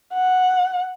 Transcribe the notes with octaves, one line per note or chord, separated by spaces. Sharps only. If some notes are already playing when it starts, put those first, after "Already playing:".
F#5